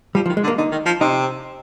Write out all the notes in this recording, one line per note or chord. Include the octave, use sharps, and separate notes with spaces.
F3 G3
F3
D#3
G#3
D3
A#3
D3 D#4
D#3
F3
C3 D#4